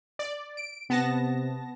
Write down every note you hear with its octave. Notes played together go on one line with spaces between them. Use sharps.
D5
D7
C3 B3 A5 A#6